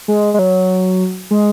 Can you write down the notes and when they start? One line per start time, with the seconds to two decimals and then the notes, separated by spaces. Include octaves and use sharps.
0.08 G#3
0.34 G#3
0.39 F#3
1.31 G#3